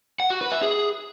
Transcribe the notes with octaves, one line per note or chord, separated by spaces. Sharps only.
F#5
F#4
B4
E5
G#4